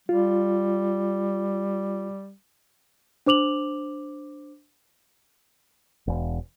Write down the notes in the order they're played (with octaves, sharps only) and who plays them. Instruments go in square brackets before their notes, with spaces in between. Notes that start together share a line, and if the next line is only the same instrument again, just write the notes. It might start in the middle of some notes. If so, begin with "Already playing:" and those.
[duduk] G3 [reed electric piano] F4
[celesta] D4 C5 D6 F7 F#7
[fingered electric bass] E1